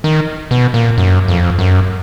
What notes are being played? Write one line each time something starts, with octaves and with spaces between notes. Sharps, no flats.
D#3
B2
A#2
F#2
F2
F#2